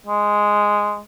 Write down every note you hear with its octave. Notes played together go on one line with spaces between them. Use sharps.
G#3